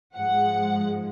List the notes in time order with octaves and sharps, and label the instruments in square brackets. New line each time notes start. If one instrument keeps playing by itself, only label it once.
[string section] G#2 F3 G#3 F#5